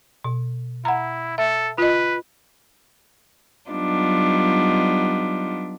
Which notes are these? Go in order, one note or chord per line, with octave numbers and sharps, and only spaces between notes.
B2
E4 F#5 A#5
A4 E5
F4 B4 D#5
F#3 G3 B3 D4 D#4 F4